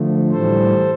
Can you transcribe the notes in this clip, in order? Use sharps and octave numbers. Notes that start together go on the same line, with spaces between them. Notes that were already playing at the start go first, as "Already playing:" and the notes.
Already playing: D3 F3 A3
A2 E3 G3 A4 C5